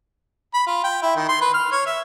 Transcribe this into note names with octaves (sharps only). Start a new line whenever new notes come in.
B5
F4
G5
E4
D#3
C6
B4
F6
C#5
E5